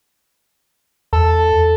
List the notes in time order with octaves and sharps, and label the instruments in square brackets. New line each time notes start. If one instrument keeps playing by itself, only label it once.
[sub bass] E2 [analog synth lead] A4